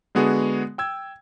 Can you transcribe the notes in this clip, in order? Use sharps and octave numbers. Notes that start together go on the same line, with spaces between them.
D3 G#3 B3 F#4 G#4
G5 E6 G#6